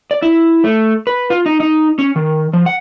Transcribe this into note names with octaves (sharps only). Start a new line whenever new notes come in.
D5
E4
A3
B4
F4
D#4
D#4
C#4
D#3
F3
F#5